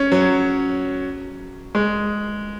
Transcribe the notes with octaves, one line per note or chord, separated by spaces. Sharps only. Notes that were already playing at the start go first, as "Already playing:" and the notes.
Already playing: C#4
F#3
G#3